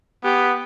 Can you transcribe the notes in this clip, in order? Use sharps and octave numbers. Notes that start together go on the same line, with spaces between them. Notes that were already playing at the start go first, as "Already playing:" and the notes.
B3 G4